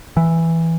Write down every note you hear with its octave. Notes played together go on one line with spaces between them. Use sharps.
E3